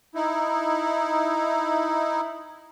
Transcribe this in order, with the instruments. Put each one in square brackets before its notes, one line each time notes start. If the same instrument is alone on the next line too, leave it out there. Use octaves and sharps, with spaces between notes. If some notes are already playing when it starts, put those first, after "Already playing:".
[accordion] D#4 E4